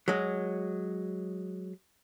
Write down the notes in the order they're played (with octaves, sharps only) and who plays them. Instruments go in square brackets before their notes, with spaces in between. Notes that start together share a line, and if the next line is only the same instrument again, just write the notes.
[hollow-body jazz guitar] F#3 G#3